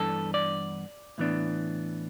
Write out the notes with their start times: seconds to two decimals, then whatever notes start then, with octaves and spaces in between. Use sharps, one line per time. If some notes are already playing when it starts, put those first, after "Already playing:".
Already playing: G2 E3 B3 D4 A4
0.34 D5
1.18 A2 E3 B3 D4